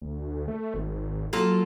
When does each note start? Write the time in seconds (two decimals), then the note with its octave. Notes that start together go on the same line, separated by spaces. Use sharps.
0.02 D2
0.48 A3
0.74 G#1
1.33 F#3 A#3 F4 A4